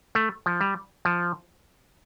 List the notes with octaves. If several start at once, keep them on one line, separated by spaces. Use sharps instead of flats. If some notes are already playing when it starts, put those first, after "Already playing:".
A3
F3
G3
F3